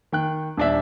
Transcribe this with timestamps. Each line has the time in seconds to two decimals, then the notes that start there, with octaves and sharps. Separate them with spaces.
0.12 D#3 G5 F#6
0.57 D#1 D4 E5